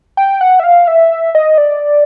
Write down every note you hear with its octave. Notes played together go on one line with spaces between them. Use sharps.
G5
F#5
E5
F5
E5
D#5
D5